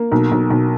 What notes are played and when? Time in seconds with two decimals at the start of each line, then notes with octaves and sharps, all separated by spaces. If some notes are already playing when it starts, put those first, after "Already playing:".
Already playing: A#3
0.12 B1
0.32 B1
0.50 B1